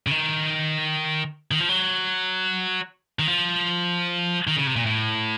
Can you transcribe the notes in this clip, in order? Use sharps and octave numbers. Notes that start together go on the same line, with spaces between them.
C#3
D#3
D#3
F3
F#3
D#3
F3
D#3
C#3
C3
A#2
A2